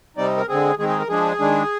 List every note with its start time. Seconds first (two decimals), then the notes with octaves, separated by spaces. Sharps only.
0.17 C3 G3 C4 D#4 D5
0.37 A#4
0.48 D3 G#3 C4 G#4
0.78 D#3 G#3 C4 D#4 G#4
0.89 G#4
0.99 A#4
1.08 F3 G#3 D4 G#4
1.39 D#3 G#3 D4